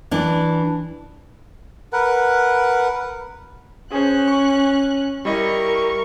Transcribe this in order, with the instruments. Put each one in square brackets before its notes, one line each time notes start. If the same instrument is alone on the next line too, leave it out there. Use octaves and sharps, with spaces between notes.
[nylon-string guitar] E3 D4
[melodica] A#4 B4 F#5
[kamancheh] C#4 F#6 [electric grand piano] G#4 C5
[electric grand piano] C#6
[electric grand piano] G3 E4 D#5 [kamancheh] A#4 C#6